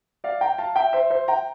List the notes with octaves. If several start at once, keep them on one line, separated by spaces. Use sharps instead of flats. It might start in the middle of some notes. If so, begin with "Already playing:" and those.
D5 F5
G5 A#5
F5 A5
E5 G5
C5 E5
C5 E5
G5 A#5